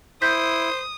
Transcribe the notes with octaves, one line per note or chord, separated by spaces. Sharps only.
E4 C5 D#6 G6 B6